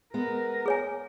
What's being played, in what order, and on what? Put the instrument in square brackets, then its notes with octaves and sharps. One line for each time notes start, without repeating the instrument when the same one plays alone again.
[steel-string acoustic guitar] G#3 B3 [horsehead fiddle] A#4
[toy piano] G#4 C#5 G#5